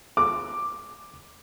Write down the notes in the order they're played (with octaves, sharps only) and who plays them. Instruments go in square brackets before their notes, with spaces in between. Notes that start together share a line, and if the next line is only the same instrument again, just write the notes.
[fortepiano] D6